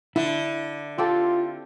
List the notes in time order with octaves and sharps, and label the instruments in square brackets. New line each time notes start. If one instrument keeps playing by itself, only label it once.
[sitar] D3 [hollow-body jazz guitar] E4 E5
[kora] C4 G4 A4 [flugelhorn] F4